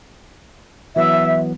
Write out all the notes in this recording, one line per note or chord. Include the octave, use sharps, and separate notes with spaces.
E3 F#3 B3 E5